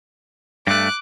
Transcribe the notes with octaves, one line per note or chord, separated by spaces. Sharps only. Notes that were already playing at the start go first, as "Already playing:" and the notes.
G2 A3 D6 F#6